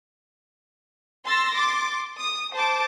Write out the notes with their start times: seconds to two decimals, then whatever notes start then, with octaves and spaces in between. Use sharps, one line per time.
1.25 C6 E6 A6 A#6
1.55 C6 D6 A6
2.17 D#6
2.53 C5 A5 D6